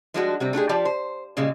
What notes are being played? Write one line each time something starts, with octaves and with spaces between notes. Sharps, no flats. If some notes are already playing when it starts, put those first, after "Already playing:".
F3 G3 G#3 D4 F4 F#4
C3 G3 C4
A3 D4 G4 G#4
F3 F4 G4 D5 A5
C5
A#2 C#3 G3 G#3